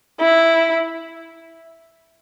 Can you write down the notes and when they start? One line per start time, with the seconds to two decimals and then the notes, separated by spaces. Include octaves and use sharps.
0.20 E4